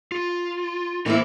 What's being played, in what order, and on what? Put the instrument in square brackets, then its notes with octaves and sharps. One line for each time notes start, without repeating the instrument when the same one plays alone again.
[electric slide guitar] F4
[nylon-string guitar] E3 A#3 E4 [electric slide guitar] D#4 A#4 C5